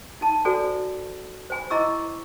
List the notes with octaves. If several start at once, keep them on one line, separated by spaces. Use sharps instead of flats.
D#4 A5
F#4 A4 C5 D5 G#5
C5 G#5 B5
E4 D#5 A#5 C#6 D6 E6